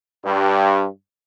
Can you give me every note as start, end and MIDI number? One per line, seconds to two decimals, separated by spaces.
0.24 0.84 43